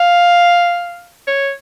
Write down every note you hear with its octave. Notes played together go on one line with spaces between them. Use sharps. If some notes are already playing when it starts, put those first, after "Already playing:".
Already playing: F5
C#5